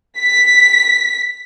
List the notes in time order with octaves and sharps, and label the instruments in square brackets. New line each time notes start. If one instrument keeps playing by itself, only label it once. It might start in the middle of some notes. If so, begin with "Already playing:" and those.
[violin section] B6